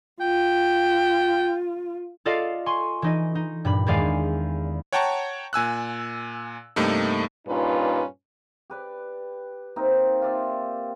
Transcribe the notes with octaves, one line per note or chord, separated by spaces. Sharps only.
F4 G5
F4 A4 D5 D#5 F5
G#5 C6 C#6
E3 D#4 D#5
D#4
G2 A#2 B5
E2 D#3 G#3 D5 F5 G#5
C#5 F#5 G5 A5 A#5 C#6
A#2 G#5 E6 F#6
G2 C3 A3 A#3 D#4
G2 A#2 C#4 D#4 F4 B4
G4 B4 D5
A#3 C4 D#4 F4
F4 G4 D5 E5